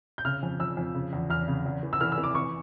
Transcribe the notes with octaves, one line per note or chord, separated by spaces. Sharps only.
G6
C#3 F6
F2
F2 E6
F2
C#3
E2
E2 F6
C#3
E2
E3
E6
E3 F6
E6
E3
D6
E3 C#6